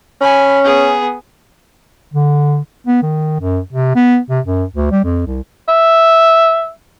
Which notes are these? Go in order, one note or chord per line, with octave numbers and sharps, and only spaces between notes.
C#4 G#5 B5
B3 G#4
D3
B3
D#3
F#2
C3
B3
C3
F#2
D2
G3
F2
C2
E5